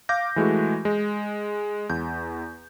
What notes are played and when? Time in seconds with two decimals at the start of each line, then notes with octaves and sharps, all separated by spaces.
0.09 F5 D6 G6 A#6
0.36 E3 G#3 A3 F#4
0.85 G#3
1.90 E2 G6